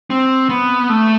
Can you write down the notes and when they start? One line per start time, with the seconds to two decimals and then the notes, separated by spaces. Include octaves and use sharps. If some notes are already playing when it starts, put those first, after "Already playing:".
0.10 C4
0.49 B3
0.89 A3